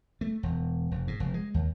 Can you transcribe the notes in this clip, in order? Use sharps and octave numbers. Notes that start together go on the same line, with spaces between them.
A3
E1
F1
G#2
F1
G#3
D#2